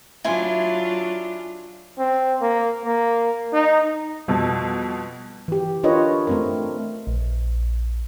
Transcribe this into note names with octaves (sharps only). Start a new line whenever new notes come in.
F#3 D4 E4 F4 G#5 C6
C4
A#3
A#3
D#4
F2 B2 G3
E3 G4
D4 F4 A#4 B4 C#5 D#5
A3 C4 A#4
A#1